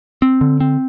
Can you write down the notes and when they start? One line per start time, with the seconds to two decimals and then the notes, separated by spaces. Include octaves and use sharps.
0.22 C4
0.41 D3
0.60 C4